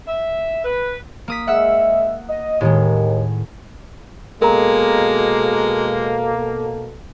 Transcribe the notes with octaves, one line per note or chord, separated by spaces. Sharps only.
E5
B4
A#3 D#6 B6
G#3 E5 F#5 E6
D#5
D#2 A2 D#3 G#3
B2 G#3 A#3 A4 A#4 A#5